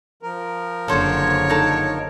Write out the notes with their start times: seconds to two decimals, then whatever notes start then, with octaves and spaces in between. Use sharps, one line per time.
0.23 F3 A#4
0.88 F#1 D3 A4 C5 C#5
1.50 D#4 A4